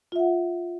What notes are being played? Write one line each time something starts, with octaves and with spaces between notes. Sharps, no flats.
F4 E5 F#5